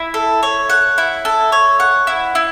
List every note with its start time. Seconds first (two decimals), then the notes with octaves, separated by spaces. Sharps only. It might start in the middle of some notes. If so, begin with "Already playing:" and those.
Already playing: E4
0.14 A4
0.43 C#5
0.70 F#5
0.98 E4
1.25 A4
1.52 C#5
1.80 F#5
2.07 E4
2.35 E4